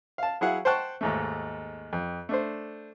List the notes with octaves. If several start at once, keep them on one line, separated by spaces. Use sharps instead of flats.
F5 A5
F#3 E4 G#4 F5 F#5
C5 F#5 G5 A5 C#6 F#6
D#2 G#2 A3
F2
A3 D4 C5